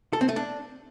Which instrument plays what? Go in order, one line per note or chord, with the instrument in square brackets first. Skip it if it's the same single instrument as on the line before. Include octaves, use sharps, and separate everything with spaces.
[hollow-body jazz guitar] A4
C4
A3
D4